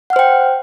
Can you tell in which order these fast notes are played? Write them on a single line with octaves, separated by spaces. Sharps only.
F#5 F6 C5 G5